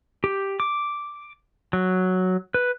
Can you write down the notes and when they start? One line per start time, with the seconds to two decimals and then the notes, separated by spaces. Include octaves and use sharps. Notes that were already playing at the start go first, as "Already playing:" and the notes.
0.24 G4
0.60 D6
1.73 F#3
2.54 B4